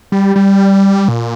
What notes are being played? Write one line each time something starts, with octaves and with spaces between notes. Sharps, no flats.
G3
G3
A#2